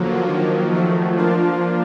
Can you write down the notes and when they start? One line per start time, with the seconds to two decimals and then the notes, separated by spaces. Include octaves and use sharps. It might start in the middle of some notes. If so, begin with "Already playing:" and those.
Already playing: D3 F3 F#3 A#3
0.27 D#3 F3 F#3 A#3
0.72 D#3 F#3 A3
1.17 F3 A#3 D4 F4